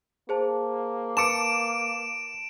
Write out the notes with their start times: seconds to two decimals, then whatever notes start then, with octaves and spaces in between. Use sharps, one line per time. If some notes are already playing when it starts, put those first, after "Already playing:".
0.29 A#3 G#4 C5 A5
1.17 B4 A5 D6 C#7 D7 E7